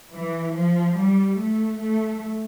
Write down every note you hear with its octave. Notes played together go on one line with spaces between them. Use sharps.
E3
F3
G3
A3
A3